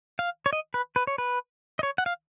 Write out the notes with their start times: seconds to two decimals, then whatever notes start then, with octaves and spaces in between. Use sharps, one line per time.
0.19 F5
0.46 C#5
0.53 D#5
0.74 B4
0.96 B4
1.07 C#5
1.18 B4
1.79 D#5
1.83 C#5
1.98 F#5
2.06 F5